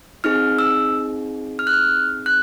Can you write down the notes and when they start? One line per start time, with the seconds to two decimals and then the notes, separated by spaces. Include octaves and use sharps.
0.24 C4 D#4 G#4 F6
0.59 E6
1.59 F6
1.67 F#6
1.73 F6
2.26 F#6